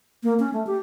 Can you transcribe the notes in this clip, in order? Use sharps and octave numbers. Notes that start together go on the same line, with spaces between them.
A#3
C#4
A3
G4